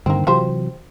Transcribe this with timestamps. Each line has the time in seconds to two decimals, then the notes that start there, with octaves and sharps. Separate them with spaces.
0.06 G2 D3 D#3 A#3 C4
0.27 C3 E3 F#3 F4 G4 C5